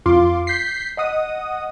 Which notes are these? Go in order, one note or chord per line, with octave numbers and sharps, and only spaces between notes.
F2 F4 C6 D6
G6 B6 C7
D#5 F#5 D#6